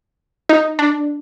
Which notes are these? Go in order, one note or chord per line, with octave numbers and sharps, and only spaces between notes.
D#4
D4